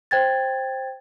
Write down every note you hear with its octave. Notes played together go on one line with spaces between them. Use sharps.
C5 G5 G#6 A6